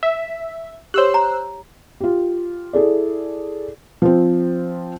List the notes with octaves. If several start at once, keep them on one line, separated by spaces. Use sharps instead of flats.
E5
G4 C5 C#5 E6 F#6
A#5
F4 G4
E4 G#4 A4 D5
F3 C4